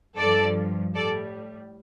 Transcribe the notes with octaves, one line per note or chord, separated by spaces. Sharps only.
G2 F3 A4 D5
A2 G3 A4 D5